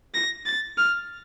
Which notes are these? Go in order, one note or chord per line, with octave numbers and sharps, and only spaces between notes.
A#6
A6
F6